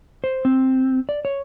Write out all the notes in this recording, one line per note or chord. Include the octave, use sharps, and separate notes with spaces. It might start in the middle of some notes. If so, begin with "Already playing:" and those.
C5
C4
D5
C#5